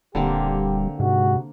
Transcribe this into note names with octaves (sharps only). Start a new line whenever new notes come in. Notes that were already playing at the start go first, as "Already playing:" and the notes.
D#1 D3 G3 A#3 C4 G4
G#2 C3 F#4